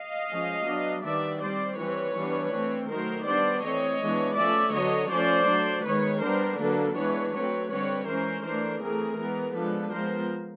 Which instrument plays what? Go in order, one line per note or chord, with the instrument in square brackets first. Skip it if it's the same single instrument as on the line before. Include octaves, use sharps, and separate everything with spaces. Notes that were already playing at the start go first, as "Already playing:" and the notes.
Already playing: [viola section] D#5 F5
F3 G#3 C#4
F#3 B3 D4
D#3 G3 B3 D4 D5 E5
G3 C4 C5 D5
E3 G3 C4 B4 C#5
E3 G3 B3 D4
E3 A3 C4
D#3 F#3 A3 A#4 C5
G3 B3 D4 C5 D5
E3 A3 C4 C#5 D#5
E3 G#3 B3 D4
F3 A3 C#4 D5 E5
D3 F#3 B3 C#5 D#5
F3 A3 C#4 C5 D5
F#3 A3 D4
D#3 G#3 B3 B4 C#5
G3 B3 D4 A#4 C5
D3 F#3 A#3 D4 A4 B4
E3 G#3 B3 D4 B4 C#5
F#3 A3 C4 B4 C#5
D3 G3 C4 B4 C#5
E3 G#3 C#4 A#4 C5
E3 A3 D4 A#4 C5
E3 A3 C4 G#4 A#4
E3 G#3 B3 G#4 A#4
F3 G#3 B3 D4 A4 B4
F3 G#3 B3 A#4 C5